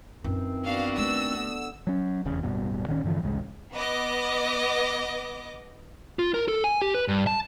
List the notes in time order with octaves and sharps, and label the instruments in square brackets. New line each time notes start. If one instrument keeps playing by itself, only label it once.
[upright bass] F#2 F4 [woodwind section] D#3 E3 C4
[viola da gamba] B3 D4 F#4 [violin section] F5
[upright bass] A3 [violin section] E6
[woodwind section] D3 B3
[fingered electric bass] F#3 C#4
F1 E2 C#3
D1 G2 B2
A1 D#3 F3 C#4
G2 D3 E3 F3
A1 D2 C#3 G#3
[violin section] B3 D#5 D6
[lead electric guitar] F4
A#4
A4
G#5
G4
B4
G2
A5